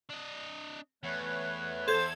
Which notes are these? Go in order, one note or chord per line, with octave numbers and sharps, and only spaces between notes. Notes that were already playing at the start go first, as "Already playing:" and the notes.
D4 D#5
E2 A3 B4 C#5
A4 C5 G#6